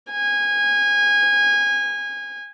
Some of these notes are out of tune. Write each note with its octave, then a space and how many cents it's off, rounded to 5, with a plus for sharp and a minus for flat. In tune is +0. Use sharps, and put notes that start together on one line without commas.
G#5 -20